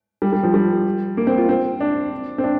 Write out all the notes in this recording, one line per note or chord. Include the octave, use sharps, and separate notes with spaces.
G3
G3
F3
G3
A#3
C4
F4
C4
D4
C4
D4